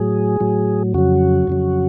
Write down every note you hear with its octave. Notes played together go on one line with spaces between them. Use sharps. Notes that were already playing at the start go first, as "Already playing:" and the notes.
Already playing: A2 F#3 G#4
A2 F#3
F2 C#3 F#3 F#4
F2 C#3 F#3